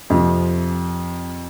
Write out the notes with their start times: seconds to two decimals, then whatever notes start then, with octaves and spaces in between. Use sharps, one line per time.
0.10 F2 C3 F3